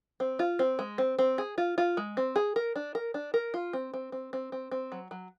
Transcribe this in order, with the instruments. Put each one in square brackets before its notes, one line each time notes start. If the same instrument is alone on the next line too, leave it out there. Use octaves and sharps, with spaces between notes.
[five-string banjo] C4
F4
C4
G#3
C4
C4
G#4
F4
F4
G#3
C4
G#4
A#4
D4
A#4
D4
A#4
F4
C4
C4
C4
C4
C4
C4
F#3
F#3